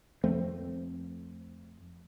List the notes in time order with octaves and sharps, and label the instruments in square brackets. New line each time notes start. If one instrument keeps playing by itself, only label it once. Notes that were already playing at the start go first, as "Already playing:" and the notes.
[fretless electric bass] F2 A3 C4